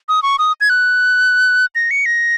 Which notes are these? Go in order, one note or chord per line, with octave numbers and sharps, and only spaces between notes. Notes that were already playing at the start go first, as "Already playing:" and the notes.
D#6
C#6
D#6
G#6
F#6
A#6
C#7
A#6